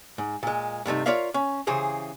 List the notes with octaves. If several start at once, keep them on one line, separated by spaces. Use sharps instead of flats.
G#2
A#2 G#3
G2 C3 A3 D#4
F4 A#4 C#5 D5 E5 F5
C#4
C#3 E3 G4 G#4 C5